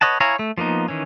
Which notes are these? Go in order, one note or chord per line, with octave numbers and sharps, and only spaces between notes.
B4 C#5 D#5 F#5 A5
E4 C#5 F5 G#5 A#5
A3
F3 A#3 B3 D#4
D#3 E3 C#4